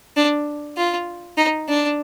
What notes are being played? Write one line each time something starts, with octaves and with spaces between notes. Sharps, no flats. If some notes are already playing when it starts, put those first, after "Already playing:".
D4
F4
D#4
D4